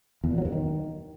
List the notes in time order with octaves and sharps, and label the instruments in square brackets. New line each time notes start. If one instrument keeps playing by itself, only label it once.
[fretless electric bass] E2
A#2
F#3
G2
D#3